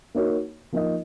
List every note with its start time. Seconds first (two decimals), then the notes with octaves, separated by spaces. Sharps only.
0.15 A#3 D#4 F#4 A#4 C#5
0.72 F3 A#3 D#4 A#4 D#5